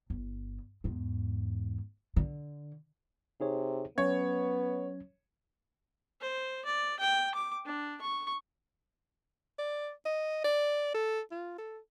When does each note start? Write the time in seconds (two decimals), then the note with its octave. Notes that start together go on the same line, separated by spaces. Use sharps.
0.10 G1
0.84 E2 G#2
2.16 D3
3.41 C3 D#4 G#4 C#5
3.98 F#3 B3 C#4 C#5 G#6
6.21 C5
6.66 D5
7.00 G5
7.35 D6
7.66 D4
8.02 C#6
9.58 D5
10.06 D#5
10.44 D5
10.94 A4
11.31 F4
11.58 A4